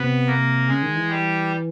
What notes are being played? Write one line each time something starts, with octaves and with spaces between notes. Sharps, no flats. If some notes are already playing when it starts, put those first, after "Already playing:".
Already playing: C3 B3 B4
A#3 A#4
C#3 G#3 G#4
D#3
E3
G3 G4